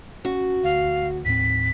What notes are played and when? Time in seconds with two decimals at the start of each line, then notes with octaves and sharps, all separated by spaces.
0.25 C#4 F#4
0.64 D2 F5
1.25 D#2 A2 C4 B6